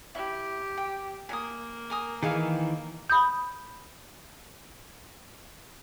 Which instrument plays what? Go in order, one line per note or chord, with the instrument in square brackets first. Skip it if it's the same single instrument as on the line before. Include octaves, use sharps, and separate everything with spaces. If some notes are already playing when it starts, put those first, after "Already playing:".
[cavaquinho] E4 [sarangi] G4
[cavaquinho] G5
[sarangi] A#3 [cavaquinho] G#5 D#6
[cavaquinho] A#4 G#5 D#6
[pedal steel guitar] D#3 E3 [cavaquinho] G#4 D#5 F5
[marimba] B5 D#6 G6